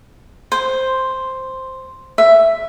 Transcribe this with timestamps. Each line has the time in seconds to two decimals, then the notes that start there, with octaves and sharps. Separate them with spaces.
0.52 C5
2.18 E5